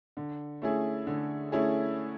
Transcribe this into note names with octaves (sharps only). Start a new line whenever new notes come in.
D3
A3 C#4 E4 G#4
D3
A3 C#4 E4 G#4